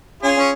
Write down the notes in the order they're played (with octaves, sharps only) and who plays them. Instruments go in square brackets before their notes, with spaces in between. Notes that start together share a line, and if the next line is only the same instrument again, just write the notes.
[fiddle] C#4 [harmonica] F4 G#4
[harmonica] C#4